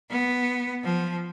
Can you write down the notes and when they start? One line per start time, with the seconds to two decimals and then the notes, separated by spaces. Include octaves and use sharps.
0.11 B3
0.84 F3